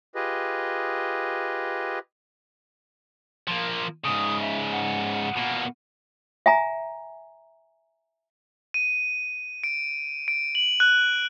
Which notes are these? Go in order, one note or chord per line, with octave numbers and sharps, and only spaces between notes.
F4 G4 G#4 B4 D#5
F3 A#3
G#2 C#3 D#6
E5
F#5
B2 A#3
E5 G#5 A#5
D#7
D7
D7
F#7
F#6